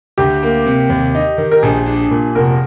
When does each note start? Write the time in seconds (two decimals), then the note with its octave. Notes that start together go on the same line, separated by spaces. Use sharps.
0.18 D2 G4
0.43 A#3
0.66 C3
0.90 D#2
1.15 D#4
1.38 D#3
1.51 A#4
1.63 A#1 G#4
1.86 D4
2.11 A#2
2.35 F1 A#4